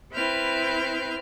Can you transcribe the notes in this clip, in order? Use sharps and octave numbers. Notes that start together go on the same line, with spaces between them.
C4 E4 B4 F6 G6